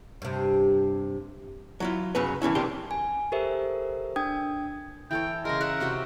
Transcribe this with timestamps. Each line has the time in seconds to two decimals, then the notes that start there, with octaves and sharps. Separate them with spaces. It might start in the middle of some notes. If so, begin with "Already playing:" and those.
0.22 G2 C3
1.80 F#3 E4 F4
2.15 C2 F#2 C#3 F#3 B4
2.42 D3 E3 C#4 E4
2.55 C2 C3 A#3 D4 G4 C6
2.91 G#5
3.32 G4 A4 A#4 C5 E5
4.16 D4 G5 D#6 G#6
5.11 E3 A4 C#5 G5
5.45 C#3 G#3 A#4
5.61 A#4 C#5 E5 F#5
5.80 C3 F#4 G5